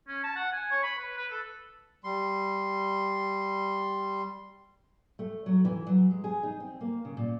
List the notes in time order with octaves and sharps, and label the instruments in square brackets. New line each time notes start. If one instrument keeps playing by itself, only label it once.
[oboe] C#4
A5
F#5
G#5
C#5
B5
B4
B4
A4
[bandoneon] G3 C6
[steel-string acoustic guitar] A3
F#3
E3
F#3
G#3
G#4
D#4
C4
A#3
C#3
A#2